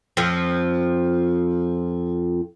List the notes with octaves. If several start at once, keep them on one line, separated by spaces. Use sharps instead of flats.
F2 F3